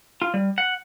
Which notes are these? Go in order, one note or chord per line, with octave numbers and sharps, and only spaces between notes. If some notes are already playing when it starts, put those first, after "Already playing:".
F4
G3
F#5